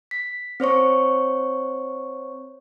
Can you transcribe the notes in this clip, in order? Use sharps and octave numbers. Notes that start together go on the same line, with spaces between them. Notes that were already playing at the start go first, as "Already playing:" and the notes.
B6
C4 C5 C#5 C#6